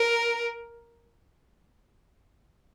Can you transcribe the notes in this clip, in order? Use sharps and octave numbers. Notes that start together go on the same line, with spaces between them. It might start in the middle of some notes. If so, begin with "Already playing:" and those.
Already playing: A#4